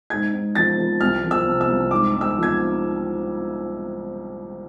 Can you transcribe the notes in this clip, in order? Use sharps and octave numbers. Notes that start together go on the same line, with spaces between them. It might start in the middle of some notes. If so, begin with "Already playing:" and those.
G#2 G#6
G#2
F3 A6
F3
C2 F6
F3
E6
C3
E6
C2
G#2 D6
G#2
E6
F3
G#6